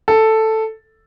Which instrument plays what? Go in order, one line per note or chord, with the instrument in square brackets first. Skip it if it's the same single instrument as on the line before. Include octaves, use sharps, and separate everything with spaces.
[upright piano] A4